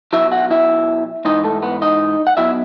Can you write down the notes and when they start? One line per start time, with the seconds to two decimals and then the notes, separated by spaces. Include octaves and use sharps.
0.13 B1 A2 F#3 E4 E5
0.32 F#4 F#5
0.50 E4 E5
1.25 G#2 E3 D#4 D#5
1.44 A3 A4
1.62 B3 B4
1.81 D#4 D#5
2.27 F#5
2.37 B1 B2 F#3 E4 E5